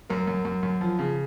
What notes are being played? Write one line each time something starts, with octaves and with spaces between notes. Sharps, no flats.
F#2 A#4
F#2
F#2
F#2
F3
C#3